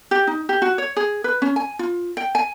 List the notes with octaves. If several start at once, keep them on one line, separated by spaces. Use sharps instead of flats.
G4
D#4
G4
F#4
C#5
G#4
B4
C#4
G#5
F4
G5
G#5